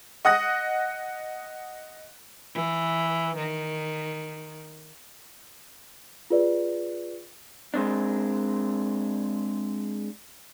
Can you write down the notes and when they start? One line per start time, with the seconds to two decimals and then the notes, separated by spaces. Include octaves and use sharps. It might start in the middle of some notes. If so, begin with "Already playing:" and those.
0.25 D#5 F#5 D#6 F#6 A#6
2.54 E3
3.36 D#3
6.30 F4 G#4 B4 D5
7.74 G#3 C4 D4